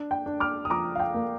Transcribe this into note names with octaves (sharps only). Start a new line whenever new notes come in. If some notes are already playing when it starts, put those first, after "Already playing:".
Already playing: D4
G5
D4
D6 F6
D#6
F3 A#5 D6
F5
G5
A#3